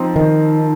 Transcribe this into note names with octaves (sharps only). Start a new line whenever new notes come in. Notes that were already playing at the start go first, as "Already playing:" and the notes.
Already playing: F3 C4 D#4
D#3